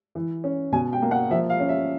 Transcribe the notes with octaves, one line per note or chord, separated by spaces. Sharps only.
E3
C#4
B2 G#5
G5
A#3
F#5
F3 E5
F5
C#4
E5